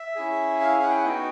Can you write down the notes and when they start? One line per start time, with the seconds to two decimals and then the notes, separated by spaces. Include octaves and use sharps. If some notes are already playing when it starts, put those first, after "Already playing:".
Already playing: E5
0.16 C#4 E4 G#4
0.61 F5
0.83 F#5
0.90 G5
0.97 F#5
1.05 B3 D#4 F#4 G5